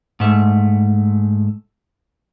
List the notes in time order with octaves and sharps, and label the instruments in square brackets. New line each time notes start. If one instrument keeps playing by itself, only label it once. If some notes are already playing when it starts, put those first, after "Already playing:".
[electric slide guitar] G#2 A3